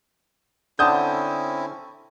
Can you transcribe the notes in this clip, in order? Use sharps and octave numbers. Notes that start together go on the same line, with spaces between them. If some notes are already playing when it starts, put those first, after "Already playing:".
D3 C4 C#4 E4 A5 D#6 G6